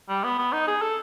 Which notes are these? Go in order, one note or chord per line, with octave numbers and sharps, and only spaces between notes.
G3
B3
B3
D#4
G#4
A4